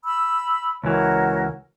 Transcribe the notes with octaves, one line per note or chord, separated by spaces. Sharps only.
B5 E6
C#2 E3 F#4 A#4 C#5